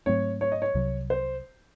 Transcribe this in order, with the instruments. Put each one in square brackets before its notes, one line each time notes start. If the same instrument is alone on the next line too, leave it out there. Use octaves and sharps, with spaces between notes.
[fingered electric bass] G#2 F#3 A3 C4 [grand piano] C#5
[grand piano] C#5
D#5
C#5
[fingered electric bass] C2 C3 F#3
[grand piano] C5